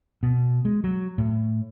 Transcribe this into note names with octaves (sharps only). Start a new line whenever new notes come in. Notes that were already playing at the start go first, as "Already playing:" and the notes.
B2
G#3
F#3
A2